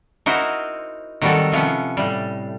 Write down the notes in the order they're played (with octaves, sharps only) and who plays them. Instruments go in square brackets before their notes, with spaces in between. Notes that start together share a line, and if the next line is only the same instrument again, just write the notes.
[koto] D#4 E4 F#4 A#4 C5
D#3 F#3 G3 C4 F#4 A4
C3 F3 B3 C#4
A2 G3